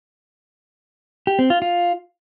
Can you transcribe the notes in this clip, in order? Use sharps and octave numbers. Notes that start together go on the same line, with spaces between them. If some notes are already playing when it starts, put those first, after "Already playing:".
G4
C4
F4
F4